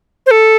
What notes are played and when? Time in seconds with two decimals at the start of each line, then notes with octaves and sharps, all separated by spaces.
0.26 C5
0.31 A4